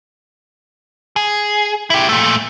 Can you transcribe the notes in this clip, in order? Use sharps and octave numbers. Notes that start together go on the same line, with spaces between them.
G#4
E4 G4
A#2 A3